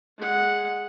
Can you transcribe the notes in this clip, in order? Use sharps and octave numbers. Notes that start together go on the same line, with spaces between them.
G#3 F#5